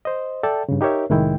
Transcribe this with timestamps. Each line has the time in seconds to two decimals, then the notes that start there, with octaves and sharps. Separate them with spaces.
0.05 C5 D#5
0.43 A4 D5 E5 G5 A5
0.69 G2 C#3
0.81 D#4 G4 A#4 C#5 E5
1.10 C2 A2 D#3 G#3 E4 G5